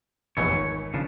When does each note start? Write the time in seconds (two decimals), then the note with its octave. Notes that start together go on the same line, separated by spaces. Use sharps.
0.37 F1 A#1 E2 C#5
0.50 G#1
0.94 C#3 F3 D4